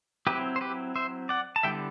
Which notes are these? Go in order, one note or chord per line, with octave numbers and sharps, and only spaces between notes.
F#3 C4 E4 G4 B4
C5
G4 B4
C5 E5
D5 F#5
A5
D3 G3 B3 E4 E5 G5